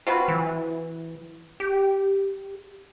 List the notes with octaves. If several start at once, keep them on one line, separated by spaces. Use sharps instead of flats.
C4 F4 F#4 B4
E3
G4